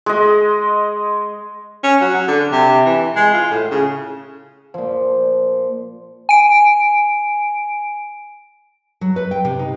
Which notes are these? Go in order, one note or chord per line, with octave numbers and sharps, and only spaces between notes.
G#3 D#5
C#4
F#3
F#3
D3
C3
E3
G#3
F4
A2
C#3
A#2 F3
G#5 D7
F#3
B4
G5
C3
D#4